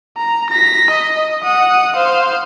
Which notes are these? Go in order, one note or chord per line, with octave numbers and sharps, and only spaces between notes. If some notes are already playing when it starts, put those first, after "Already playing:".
A#5
A#6 B6
D#5
F#5 D#6
C5 F5